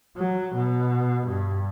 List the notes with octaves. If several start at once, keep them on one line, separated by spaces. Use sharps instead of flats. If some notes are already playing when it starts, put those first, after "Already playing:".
F#3
B2
G2